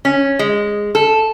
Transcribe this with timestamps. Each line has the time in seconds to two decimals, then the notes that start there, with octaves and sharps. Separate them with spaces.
0.05 C#4
0.39 G#3
0.95 A4